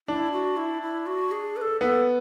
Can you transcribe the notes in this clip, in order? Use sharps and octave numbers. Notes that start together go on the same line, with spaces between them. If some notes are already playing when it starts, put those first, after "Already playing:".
D4 E4
F#4
E4
E4
F#4
G#4
B4
A4
B3 A4